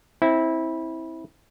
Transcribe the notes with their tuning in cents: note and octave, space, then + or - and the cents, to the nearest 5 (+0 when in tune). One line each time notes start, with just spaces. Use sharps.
C4 +15 E4 -20